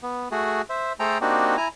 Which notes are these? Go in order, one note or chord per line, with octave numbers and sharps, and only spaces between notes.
B3
A3 F#4 G#4
C5 E5
A3 G#4 A4 C5 G5 A#5
A#3 C4 D4 D#4 F#4 G4
E4 G#5 A#5